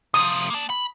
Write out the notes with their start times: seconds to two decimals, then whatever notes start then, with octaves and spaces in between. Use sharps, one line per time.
0.14 C3 F3 D#6
0.50 A#3 A5
0.70 B5